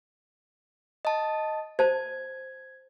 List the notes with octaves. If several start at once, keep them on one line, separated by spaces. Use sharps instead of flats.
D#5 A5
C5 A5 G#6